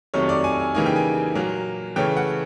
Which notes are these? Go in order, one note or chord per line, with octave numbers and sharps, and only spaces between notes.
F2 C3 D#3 F#3 A3 C#5
D5
G#5
G#5
C#3 E3 G3 A#3 D#4 G#5
G5
G#5
A#2 F#3 A#3
C#3 E3 A3 C#4 G5
F#5